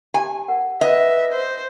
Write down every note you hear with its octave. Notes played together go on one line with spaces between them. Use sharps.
G4 G#5 A5
A#4 F#5
B4 D#5 E5
C5